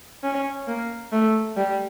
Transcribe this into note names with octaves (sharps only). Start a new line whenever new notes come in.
C#4
A#3
A3
G3